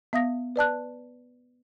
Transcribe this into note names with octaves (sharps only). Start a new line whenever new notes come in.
B3 E5 F5 D#6 A#6
B4 D5 A5 F#6